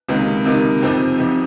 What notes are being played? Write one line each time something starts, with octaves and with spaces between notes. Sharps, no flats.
C#2 C3 D#3 A#3 D#4
C#2 C3 D#3 A#3 D#4
F2 C3 F3 C4 D#4
F2 C3 F3 C4 D#4